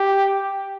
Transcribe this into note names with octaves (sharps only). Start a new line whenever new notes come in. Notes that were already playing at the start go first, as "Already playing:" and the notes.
Already playing: G4